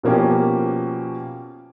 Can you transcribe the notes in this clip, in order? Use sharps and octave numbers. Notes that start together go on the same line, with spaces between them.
B2 F3 A#3 C#4 G4